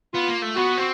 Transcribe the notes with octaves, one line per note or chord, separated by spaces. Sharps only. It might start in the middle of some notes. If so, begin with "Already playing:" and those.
B3 F4
A#3
A3
B3 F#4
C4